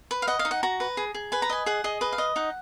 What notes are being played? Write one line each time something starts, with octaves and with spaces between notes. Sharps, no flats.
B4
F5
D#5 F#5
F5
D#4
F#5
F#4 A#5
B4
G#4
G#4
B4 G#5
A#5
D#5 G#5
G#4 F#5
G#4 D#5
B4 D#5
F5
D#5
D#4 F#5